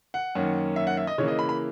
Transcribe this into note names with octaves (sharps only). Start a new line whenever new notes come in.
F#5
F#2 D#3 A#3 C#4
E5
F#5
E5
D#5
C#3 E3 A#3 C#5
D#5
B5
B5